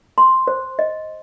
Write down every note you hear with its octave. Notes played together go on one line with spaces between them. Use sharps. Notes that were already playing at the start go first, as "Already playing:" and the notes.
C6
C5
D#5